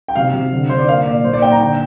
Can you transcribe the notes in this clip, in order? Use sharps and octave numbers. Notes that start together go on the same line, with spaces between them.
G5
C3 F5
C3
D3
D3 C5
D5
A#3 F5
A#2 D5
A#2 C5
D5
A#2 G5
A#5
D3 G5